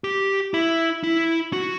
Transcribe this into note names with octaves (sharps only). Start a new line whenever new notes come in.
G4
E4
E4
F#4